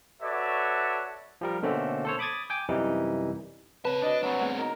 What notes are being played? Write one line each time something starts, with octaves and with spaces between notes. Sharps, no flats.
F#4 A4 B4 C#5 D5 E5
F3 G3 A#4
B2 D3 A3 A#3 C4 C#4
A4 C5 C#5
B5 D6 D#6 G#6 A6
G5 G#5 D6
F#2 C3 E3 G3 D#4
C#3 C4 B4 C#5 A5
D4 F#4 C5 C#5 D#5
F#3 C4 D4 C#5 G#5 B5
A3 B3 G#4
D#4 F#4 A#4 D#5